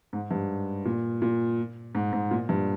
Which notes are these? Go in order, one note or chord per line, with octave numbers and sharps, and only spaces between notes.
G#2
G2
A#2
A#2
G#2
G#2
A#2
G2